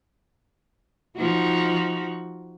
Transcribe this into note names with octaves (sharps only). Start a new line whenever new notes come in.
F3 D#4 F#4